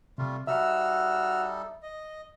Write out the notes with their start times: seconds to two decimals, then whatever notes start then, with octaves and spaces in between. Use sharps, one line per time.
0.18 C3 G3 A3 F4
0.47 G3 D#4 F#4 A4 E5 E6 F6
1.83 D#5